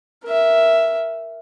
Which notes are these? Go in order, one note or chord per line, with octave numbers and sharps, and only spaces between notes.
A#4 E5